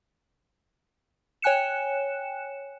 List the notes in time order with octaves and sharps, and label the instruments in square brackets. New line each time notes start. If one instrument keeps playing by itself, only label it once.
[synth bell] C#5 G5 G#5 F#6 C#7 E7